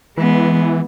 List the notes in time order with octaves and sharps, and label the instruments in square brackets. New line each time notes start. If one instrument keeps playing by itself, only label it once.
[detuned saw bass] E3 [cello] G#3 B3